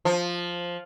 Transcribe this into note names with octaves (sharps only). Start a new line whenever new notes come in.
F3